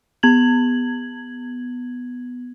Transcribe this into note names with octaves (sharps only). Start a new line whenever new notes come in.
B3 G#6 F#7